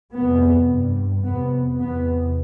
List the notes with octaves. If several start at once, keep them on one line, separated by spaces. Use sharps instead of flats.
F2 C3 B3
G2
F2 C3 B3
E2 C3 B3